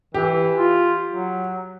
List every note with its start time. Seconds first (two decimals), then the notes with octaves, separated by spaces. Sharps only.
0.14 E3 G4
0.58 F4
1.11 F#3